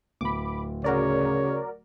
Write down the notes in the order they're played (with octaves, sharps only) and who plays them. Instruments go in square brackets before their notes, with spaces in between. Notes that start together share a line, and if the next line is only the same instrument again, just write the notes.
[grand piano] D1 [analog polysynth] B5 D6
[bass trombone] C#3 [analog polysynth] F#4 A#4 D5 [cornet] C#5